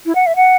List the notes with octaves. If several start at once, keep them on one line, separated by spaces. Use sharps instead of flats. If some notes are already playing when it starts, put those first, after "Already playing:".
E4
F#5
E5
F#5